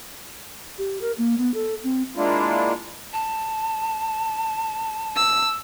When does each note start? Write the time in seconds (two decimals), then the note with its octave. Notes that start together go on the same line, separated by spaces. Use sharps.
0.78 G4
1.01 A#4
1.18 A#3
1.38 B3
1.54 A4
1.84 C4
2.16 G#3 A#3 D4 E4 F4
3.13 A5
5.16 E6